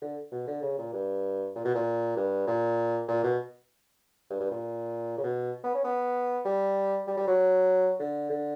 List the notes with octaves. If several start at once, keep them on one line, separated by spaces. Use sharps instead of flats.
D3
B2
D3
C#3
A#2
G2
A#2
B2
A#2
G2
A#2
A#2
B2
G2
G2
A#2
C#3
B2
B3
C#4
B3
G3
G3
G3
F#3
D3
D3